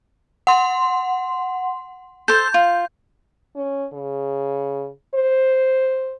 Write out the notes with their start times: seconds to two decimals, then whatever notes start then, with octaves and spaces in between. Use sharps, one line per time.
0.47 F#5 C6
2.28 A4 C5 G6
2.54 F4
3.56 C#4
3.93 C#3
5.15 C5